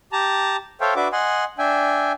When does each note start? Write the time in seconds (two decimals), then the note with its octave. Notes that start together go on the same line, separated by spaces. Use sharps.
0.12 G4 A5 A#5
0.81 A4 C5 C#5 E5 F5 G5
0.96 D4 F#4 B4 E5 D6
1.12 D#5 F#5 G#5 C6
1.58 D4 E5 G5 G#5